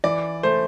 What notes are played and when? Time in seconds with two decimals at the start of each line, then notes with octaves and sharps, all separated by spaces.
0.04 E3 D5
0.43 A3 C5